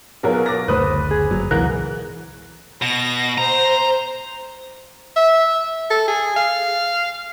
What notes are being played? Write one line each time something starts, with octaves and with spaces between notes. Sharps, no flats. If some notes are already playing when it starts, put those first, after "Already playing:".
B1 F#3 B3 F4 G#4 A#4
D6 A6 A#6
F#1 D2 A3 B4 C5 D#6 F#6
G#4
G1 F#3
C#2 G#2 B2 E3 A#4 F#6
B2 A#6
C5 A#5
E5
A4
G#4
F5